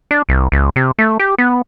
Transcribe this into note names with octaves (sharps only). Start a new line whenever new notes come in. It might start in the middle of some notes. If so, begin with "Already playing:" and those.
D4
C2
C#2
C3
A3
G4
B3